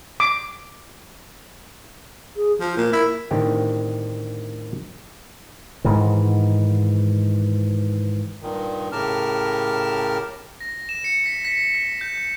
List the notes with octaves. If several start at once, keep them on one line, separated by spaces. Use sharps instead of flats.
D6
G#4
F3 F4
A#2 A#3
E4 A#4
A2 D3 D#3 C4 G4
G#2 D#3 E3
G2 A#2 D#3
A2 C#3 G4 A#4 A5 F6
A#6
E7
C#7
B6
B6
B6
G6